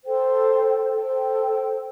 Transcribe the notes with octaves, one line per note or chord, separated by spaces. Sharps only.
A4 C5 G5
A4 C5 G5